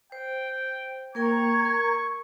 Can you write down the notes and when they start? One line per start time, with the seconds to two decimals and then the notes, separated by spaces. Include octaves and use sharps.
0.12 C5 G5
1.15 A#3 A#4 G5 A#5 C#6 G#6
1.65 A#4